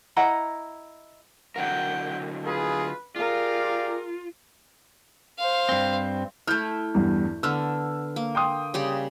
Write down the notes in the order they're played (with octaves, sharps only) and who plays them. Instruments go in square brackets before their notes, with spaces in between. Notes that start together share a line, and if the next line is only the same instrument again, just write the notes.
[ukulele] E4 D#5 F#5 A#5
[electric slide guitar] D3 F#3 A#4 [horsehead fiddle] F#5 G5
[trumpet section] F4 G#4 [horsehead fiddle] B4
[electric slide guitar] F4 [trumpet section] G4 D5 F5 [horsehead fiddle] G#4 A#4
[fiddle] C5 F5
[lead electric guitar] G2 C4
[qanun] A3 E4 [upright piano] F6 G6
[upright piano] E2 G2
[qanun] D3 B3 [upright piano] E6 F6
[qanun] A#3
[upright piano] G5 C6 D#6
[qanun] C#3 G3 G4